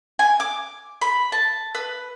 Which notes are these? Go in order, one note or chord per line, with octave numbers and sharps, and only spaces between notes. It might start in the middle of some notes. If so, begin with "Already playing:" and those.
G#5
D6
B5
A5
B4